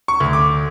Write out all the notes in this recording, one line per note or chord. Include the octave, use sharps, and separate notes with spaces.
C#6
D2
D6